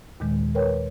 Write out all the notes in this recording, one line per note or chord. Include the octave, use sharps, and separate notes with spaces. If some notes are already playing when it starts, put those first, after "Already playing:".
D#2 A#2 D#3 G#3
A#4 B4 C#5 G5